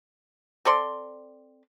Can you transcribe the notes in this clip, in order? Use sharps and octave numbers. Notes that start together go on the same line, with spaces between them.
C4 A4 D5 C6